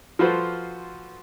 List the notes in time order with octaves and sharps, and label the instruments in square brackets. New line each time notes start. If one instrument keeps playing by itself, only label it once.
[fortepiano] F3 F4 F#4 A4 B4 C5